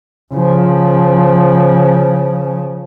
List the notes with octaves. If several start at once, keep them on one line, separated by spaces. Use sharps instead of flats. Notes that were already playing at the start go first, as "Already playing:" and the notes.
C#3 F3